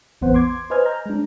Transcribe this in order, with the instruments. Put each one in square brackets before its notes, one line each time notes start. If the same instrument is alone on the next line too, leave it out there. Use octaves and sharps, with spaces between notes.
[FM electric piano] A1 E2 B3 C5 F#5
C6 D6 G#6
B4 C5 D#5 G#5 F6 G#6
A#5 F6 G6
G#3 D4